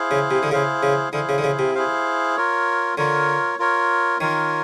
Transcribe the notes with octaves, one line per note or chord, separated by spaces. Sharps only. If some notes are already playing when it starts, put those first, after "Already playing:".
Already playing: E4 G#4 C5 F5
C#3
C3
D3
C#3 E4 G#4 C5 F5
C#3
D3 E4 G#4 C5 F5
C#3
D3
C#3
C3
E4 G#4 C5 F5
F4 A#4 C#5
D3 F4 A#4 C#5
F4 A#4 C#5
D#3 F4 A#4 C#5